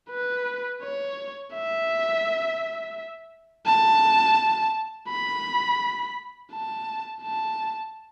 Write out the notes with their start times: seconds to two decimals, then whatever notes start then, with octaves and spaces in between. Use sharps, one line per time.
0.10 B4
0.82 C#5
1.53 E5
3.67 A5
5.09 B5
6.52 A5
7.22 A5